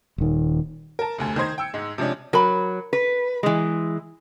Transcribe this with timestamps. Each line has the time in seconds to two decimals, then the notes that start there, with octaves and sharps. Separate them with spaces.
0.18 D#1 D#3
0.99 A#4 A5
1.18 F1 D2 G#5
1.36 D#3 D#4 C5 G#6
1.58 G5 E6 C#7
1.74 G#2 G#3
1.98 C3 F3 G#3 C#4 D4
2.33 F#3 A#4 B5
2.93 B4
3.43 E3 G#3